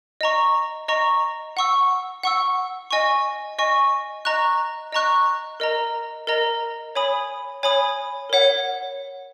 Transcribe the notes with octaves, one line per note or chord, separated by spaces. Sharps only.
D#5 A#5 C#6
D#5 A#5 C#6
F#5 C#6 E6
F#5 C#6 E6
D#5 G#5 C#6
D#5 G#5 C#6
D#5 A#5 C#6 F#6
D#5 A#5 C#6 F#6
A#4 D#5 A#5
A#4 D#5 A#5
C#5 G#5 B5 D#6
C#5 G#5 B5 D#6
A#4 C#5 F#5